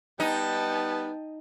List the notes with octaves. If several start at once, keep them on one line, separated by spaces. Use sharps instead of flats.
G3 B3 D#4 G5 A5